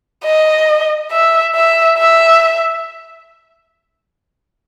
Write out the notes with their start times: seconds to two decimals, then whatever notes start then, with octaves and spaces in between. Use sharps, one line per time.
0.25 D#5
1.12 E5
1.55 E5
1.98 E5